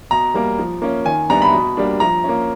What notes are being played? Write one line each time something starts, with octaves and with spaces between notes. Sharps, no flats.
B2 A#5
G3 A#3
F3
A#3 C#4
D#3 G#5
G3 B3 D4 A#5
B5
B2
G3 A#3 D4
F3 A#5
A#3 C#4